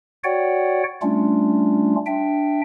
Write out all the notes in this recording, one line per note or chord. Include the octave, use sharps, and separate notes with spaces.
F#4 C#5 D5 F#5 G5
G3 A3 C#4 D4 F4
D4 E5 G5